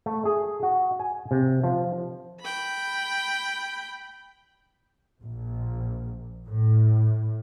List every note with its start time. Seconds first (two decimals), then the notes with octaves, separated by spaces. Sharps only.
0.06 A3
0.25 G#4
0.63 F#4
0.99 G#5
1.31 C3
1.63 F3
2.41 G5 B5
5.22 A#1
6.46 A2